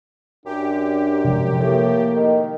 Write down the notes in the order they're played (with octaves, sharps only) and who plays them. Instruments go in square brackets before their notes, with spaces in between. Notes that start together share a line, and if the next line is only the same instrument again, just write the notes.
[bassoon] F#2 [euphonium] D4 [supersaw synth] G4
[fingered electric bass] C3 F3 G#3
[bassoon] A2 [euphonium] A#3
[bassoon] D#3